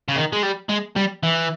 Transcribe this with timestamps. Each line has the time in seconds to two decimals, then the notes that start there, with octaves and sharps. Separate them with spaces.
0.09 C#3
0.16 D#3
0.33 G#3
0.43 G3
0.69 G#3
0.96 G3
1.23 E3